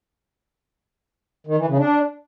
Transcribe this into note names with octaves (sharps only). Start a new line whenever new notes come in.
D#3
E3
C#3
D4